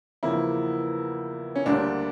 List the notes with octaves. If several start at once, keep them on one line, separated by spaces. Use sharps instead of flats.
E2 C#3 F3 A#3 E4
C#4
D2 D3 G3 A#3 D4